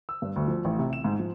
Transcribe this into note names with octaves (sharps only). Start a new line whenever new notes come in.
E6
G2
D2
F3
A1
C3
E7
G#2
F3